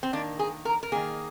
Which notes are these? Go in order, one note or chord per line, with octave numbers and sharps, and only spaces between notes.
C4
D#3 A#3 D4
G#4
A#4
A#4
D#3 A#3 G#4